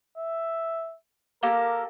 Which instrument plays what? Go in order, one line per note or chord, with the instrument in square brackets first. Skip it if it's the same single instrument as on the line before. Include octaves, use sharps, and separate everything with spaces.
[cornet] E5
[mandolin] A#3 G4 A4 [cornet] A#4